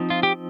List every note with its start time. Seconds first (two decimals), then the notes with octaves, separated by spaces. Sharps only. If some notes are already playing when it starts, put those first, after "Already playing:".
Already playing: F3 C4 D#4
0.10 F4
0.23 G4